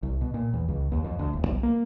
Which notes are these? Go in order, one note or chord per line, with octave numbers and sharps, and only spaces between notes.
C2
B2
A#2
E2
C#2
D#2
F2
D2
D#1
B1
A#3